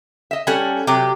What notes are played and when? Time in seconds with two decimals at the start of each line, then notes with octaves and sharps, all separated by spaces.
0.31 D#5 E5
0.47 G3 C#4 A4 F#5 G#5
0.87 C3 F#3 G4